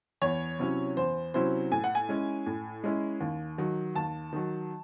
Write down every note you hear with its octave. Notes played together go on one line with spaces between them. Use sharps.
E2 C#5
C3 F#3 C#4 E4
E2 C5
C3 F#3 C#4 E4 C5
A2 G#5
F#5
G#5
G#3 C#4 E4
A2
G#3 C#4 E4
D#2
D#3 F#3
D#2 A5
D#3 F#3